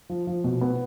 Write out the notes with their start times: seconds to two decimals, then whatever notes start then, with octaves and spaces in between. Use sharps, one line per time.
0.09 F3
0.27 F3
0.44 B2
0.61 B3